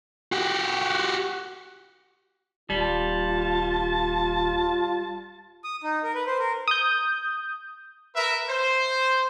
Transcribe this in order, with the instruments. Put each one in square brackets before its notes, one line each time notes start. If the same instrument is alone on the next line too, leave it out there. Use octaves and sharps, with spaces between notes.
[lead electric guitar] F#4 G4
[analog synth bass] D#1 [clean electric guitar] G3 [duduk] F4 [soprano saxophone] A5
[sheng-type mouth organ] D#6
D#4
A#4
B4
C5
A#4
[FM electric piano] D#6 G6
[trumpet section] A#4 B4 E5
C5